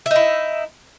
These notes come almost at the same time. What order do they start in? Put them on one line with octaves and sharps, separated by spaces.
E5 D#4 E4